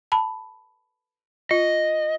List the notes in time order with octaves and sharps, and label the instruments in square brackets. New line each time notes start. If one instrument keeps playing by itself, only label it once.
[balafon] A5 B5
[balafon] F4 [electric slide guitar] D#5